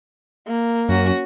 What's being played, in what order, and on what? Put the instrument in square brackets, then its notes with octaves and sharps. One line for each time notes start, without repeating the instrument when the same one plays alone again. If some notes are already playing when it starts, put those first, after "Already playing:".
[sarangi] A#3
[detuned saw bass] F#2 [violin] C#4 F#4